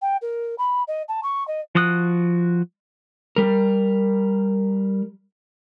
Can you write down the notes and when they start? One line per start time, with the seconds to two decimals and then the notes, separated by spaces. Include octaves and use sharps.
0.02 G5
0.21 A#4
0.58 B5
0.88 D#5
1.08 A5
1.23 C#6
1.47 D#5
1.75 F3 F#4 D#6 F#6
3.36 G3 A#4